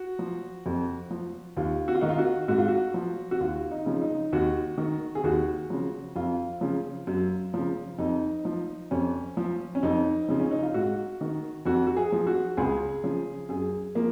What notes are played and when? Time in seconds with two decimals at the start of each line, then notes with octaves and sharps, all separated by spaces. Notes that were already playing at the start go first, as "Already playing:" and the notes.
Already playing: F#4
0.19 F3
0.66 F2
1.11 F3
1.57 D#2 F4
1.88 F#4
1.95 F4
2.01 D#3 D#4
2.09 F4
2.18 F#4
2.48 G#2 F#4
2.58 F4
2.68 F#4
2.94 F3
3.31 F#4
3.40 D#2 F4
3.71 D#4
3.86 C#3 F3
4.02 D#4
4.33 D#2 F#4
4.78 D#3
5.15 G#4
5.24 D#2 F#4
5.70 C#3 F3
6.16 F2 F4
6.61 C#3 F3
7.07 F#2
7.54 C#3 F3
7.99 F2 D#4
8.45 F3
8.91 F2 C#4
9.37 F3
9.75 C#4
9.83 F2 D#4
10.28 C#3 F3
10.40 C#4
10.51 D#4
10.63 F4
10.74 G#2 F#4
11.21 D#3
11.66 F2 F#4
11.87 F#4
11.97 G#4
12.12 F3
12.27 F#4
12.57 C#2 G#4
13.04 C#3 F3
13.49 F#2 G#4
13.95 F3 A#3